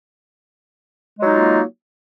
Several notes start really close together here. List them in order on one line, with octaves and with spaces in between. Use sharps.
G#3 F#3 D#4 F4 A#3